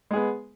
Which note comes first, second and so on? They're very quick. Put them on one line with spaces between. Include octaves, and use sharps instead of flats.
G#3 G#4 B3